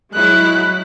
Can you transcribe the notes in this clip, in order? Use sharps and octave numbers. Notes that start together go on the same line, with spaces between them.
F#3 G#3 E4 F#6